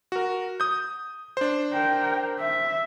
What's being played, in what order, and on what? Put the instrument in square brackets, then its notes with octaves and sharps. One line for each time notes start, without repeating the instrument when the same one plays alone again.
[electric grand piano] F#4 A#4
D#6 G6
D4 C5
[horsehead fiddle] A#4 G5
E5